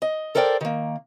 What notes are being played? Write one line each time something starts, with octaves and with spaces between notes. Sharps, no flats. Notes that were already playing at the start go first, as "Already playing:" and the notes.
D#5
A4 A#4 C5 D5 G5
D#3 A#3